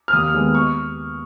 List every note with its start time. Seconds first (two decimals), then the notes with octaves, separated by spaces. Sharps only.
0.08 F6
0.12 D#2 D#6
0.34 D#3 G#3 B3
0.54 C#6